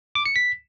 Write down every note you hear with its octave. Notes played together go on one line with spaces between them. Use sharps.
D6
C#7
B6